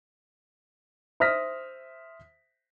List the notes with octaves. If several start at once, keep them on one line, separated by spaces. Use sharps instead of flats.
C5 E5 D#6 F6 A#6 B6